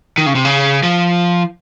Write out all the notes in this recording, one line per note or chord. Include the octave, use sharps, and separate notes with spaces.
D#3
C#3
C3
C#3
F3